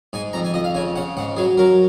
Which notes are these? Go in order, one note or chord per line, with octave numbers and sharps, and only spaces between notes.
G#2 G#5
F2 A#5
G#5
F2 D#5
F5
C#3 G#5
C#3 F#5
G#2 F#5
F#3 G#4
F#3 A#4